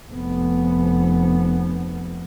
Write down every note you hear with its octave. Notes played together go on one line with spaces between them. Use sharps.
F1 B3